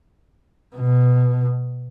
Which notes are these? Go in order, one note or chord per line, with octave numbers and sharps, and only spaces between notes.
B2